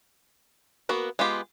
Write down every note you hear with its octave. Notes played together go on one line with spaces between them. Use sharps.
A#3 B3 F#4 A#4
G#3 B3 F4 G4